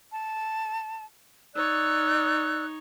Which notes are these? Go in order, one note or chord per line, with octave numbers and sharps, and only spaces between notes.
A5
D#4 C#5 D5 E6 F#6